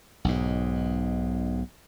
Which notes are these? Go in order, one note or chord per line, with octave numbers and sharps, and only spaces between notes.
B1 G#2